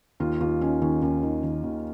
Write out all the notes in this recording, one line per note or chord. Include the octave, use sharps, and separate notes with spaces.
D#2 F4
D#2 F4
D#3 C#4
D#2 C#4
D#2 C#4
D#3
D#3
D#2